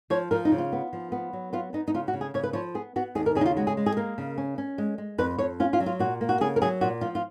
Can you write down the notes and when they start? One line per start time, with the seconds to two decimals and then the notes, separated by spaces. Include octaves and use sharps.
0.10 F3 C#5
0.31 F3 A#4
0.45 D#4
0.52 C#3
0.58 F4
0.72 B3
0.93 F3
1.12 B3
1.33 F#3
1.53 B3 F4
1.73 B3 D#4
1.88 D#4
1.94 C#3 F4
2.08 F#4
2.13 C#3
2.21 G#4
2.34 C#3 C#5
2.44 B4
2.53 F3 C#5
2.74 B3 G#4
2.96 B3 F#4
3.15 D#2 G#4
3.26 A#4
3.35 C#3 G#4
3.41 D#4
3.46 F4
3.57 G#3 F#4
3.67 G#4
3.77 G#3
3.86 G#4
3.97 A#3 A#4
4.18 C#3
4.38 C#4
4.58 C#4
4.78 G#3
4.98 G#3
5.18 F2 B4
5.38 F2 C#5
5.60 C#4 F4
5.73 F4
5.80 F#3
5.86 F4
5.99 A#2 F#4
6.21 A#3
6.29 F#4
6.41 C#3 G#4
6.56 A#4
6.62 F#3 G#4
6.81 A#2 F#4
7.01 F3 F4
7.15 F4